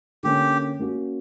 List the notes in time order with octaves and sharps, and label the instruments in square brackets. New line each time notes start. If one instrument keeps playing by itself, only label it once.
[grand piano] D3 A#3 C#4 [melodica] G4
[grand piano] A#3 C#4 F#4